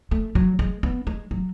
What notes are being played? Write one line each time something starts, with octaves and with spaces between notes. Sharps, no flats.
A3
F#3
G#3
B3
G#3
F#3